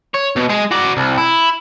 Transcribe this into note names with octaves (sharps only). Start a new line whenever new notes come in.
C#5
B2
G#3 G#4
F#4 D5
C2
E4